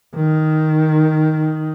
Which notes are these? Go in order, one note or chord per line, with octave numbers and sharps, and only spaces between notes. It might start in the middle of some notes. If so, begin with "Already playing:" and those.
D#3